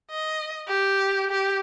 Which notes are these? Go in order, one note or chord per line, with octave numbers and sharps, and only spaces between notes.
D#5
G4
G4